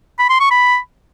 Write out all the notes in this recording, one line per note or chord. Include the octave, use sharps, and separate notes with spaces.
B5
C6
C#6
B5